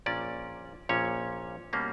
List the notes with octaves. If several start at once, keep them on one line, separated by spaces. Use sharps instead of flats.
A#1 A#2 A#3 C#4 D5
A#1 A#2 A#3 C#4 C#5
B2 G3 A#3 C#4